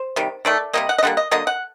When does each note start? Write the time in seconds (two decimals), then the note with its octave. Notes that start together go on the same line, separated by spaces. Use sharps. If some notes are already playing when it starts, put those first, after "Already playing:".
Already playing: C5
0.16 C3 D#3 G3
0.45 D#3 A3 D5
0.73 C3 G3 A#3 D#5
0.89 F#5
0.98 D#5
1.03 D3 G3 A#3 F#5
1.17 D#5
1.31 D3 F#3 A#3 D#5
1.47 F#5